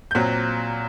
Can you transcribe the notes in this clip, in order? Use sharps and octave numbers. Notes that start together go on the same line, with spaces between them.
G6
A#2 F#3 C4 F#6